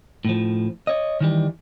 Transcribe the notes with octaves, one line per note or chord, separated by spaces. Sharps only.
A2 F3
C#5 D#5
D#3 E3 G3